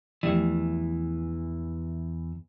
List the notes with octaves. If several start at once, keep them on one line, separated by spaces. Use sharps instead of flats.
E2 E3 F3 A3 G4